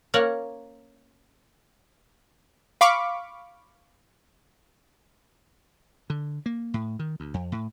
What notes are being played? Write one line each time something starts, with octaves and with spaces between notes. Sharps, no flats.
A#3 C#4 A#4 C#5 D5 F#5
F5 B5 C#6 D6
D3
A#3
A2
D#3
D2
F2
A2